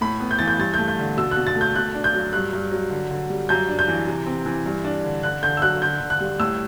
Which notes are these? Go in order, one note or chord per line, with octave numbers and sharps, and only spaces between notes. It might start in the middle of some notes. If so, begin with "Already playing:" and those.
A2 B5
B3
G6
E3 A6
G6
G2 A6
A3 G6
G6
D3
B2 E6
F#6
B2
A6
A3
G6
B2 F#6
D4
G6
F#3
G2 F#6
G2
F#3
D3
D3
G3
F#2 G6
D4
G6
E3
C3
C4
E3
G2
D4
D3
D3 F#6
D3 G6
E6
F#3 F#6
D3 G6
D3
F#6
G3
A2 E6